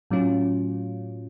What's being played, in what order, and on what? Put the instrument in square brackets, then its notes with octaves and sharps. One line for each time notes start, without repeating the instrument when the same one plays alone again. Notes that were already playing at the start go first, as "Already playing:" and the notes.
[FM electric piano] A2 F#3 C#4 F4